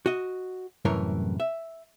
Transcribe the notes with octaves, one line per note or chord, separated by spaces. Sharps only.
F#4 D#5
C2 F#2 A2 E3 A#4 C#5
E5